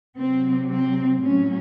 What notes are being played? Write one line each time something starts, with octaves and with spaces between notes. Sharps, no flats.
C3 F#3 C4
C4
A2 F#3 C#4